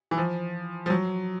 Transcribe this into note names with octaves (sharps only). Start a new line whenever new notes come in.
E3
F3
F3
F#3